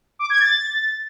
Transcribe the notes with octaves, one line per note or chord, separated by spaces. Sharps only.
D6
G#6
A6